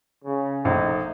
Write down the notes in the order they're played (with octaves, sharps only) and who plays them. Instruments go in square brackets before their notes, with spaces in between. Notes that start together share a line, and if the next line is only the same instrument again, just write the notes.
[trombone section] C#3
[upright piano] A#1 [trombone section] A3 D#4